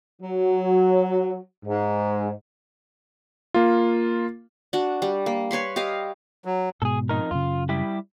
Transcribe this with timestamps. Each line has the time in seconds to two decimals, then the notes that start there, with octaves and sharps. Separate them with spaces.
0.21 F#3
1.66 G#2
3.54 A#3 F4
4.73 D4 F#4
5.02 G3
5.26 A#3
5.51 B4 C#5 B5 C6
5.76 G4 D#5 F5
6.45 F#3
6.82 G#2 B2 G#4 A4
7.09 F2 D#4 A#4
7.31 F#2 C#3 F4
7.69 G3 E4 G4